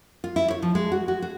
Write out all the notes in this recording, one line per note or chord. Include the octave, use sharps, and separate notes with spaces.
F4
E4
C#5
F3
G#3
F#4
F#4
F#4